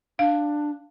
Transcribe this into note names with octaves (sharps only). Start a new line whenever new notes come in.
D4 F5